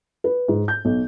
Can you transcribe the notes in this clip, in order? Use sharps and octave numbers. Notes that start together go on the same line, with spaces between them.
B4
G#2
G6
B1